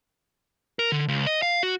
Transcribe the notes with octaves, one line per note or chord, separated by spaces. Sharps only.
A#4
D3
C#2
D#5
F5
F#4